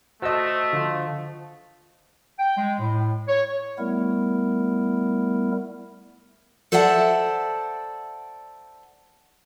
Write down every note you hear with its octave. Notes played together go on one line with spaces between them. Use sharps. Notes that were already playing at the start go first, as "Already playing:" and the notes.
A3 F#4 C5 D#5 A5 E6
D3 F3
G5
G#3
A2
C#5
G3 A3 B3 E4 A#4
A4 C5 D5 E5 F#5 A5